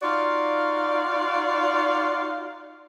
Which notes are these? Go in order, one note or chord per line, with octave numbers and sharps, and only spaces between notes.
D#4 F4 F#4 D5 F5